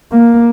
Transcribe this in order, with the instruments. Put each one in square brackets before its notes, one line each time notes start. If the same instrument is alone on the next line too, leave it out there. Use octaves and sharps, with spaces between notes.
[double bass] A#3